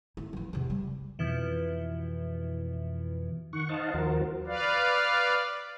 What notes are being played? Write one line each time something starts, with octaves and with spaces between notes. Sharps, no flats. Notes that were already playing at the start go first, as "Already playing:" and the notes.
E4
E3 F3
E2 C3
G3
F2 B2 E3
D#3 F#5 C#6
D#4 C5 D#5 F5 F#5 A5
D#2 F3 F#4 A#4 C5
B4 D5 F5